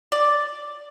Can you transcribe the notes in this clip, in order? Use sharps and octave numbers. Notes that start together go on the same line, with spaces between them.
D5